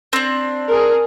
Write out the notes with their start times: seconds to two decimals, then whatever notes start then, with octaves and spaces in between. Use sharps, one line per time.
0.13 C4 D4
0.69 G#4 A#4